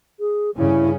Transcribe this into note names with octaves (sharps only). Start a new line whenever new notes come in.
G#4
G2 C#3 C#4 E4